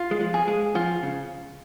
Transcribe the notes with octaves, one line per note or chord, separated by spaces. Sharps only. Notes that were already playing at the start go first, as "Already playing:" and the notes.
Already playing: F4
G#3
F3
G#4
G#3
F3 F4
C#3